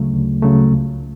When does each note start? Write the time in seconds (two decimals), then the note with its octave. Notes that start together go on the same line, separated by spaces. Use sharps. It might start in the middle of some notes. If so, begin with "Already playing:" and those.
Already playing: D2 C#3 F#3 A3
0.13 D2
0.43 C#3 F#3 A3
0.72 C#2